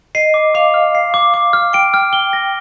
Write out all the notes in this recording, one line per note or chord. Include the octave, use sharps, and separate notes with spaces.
D#5 C7
D6
F5 D6
F6
C7
D6
D6
F6
G5 D7
F6
G7
A#6